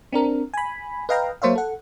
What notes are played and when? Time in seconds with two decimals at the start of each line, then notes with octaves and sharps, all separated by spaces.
0.12 C4 D4 A#4
0.54 G#5 B5
1.09 B4 D#5 F5 G5 A#5
1.42 F#3 A#3 C5 C#5 E5 F5
1.55 A4 F#5